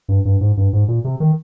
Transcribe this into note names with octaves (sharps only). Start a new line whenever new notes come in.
G2
G2
G#2
G2
G#2
A#2
C3
D#3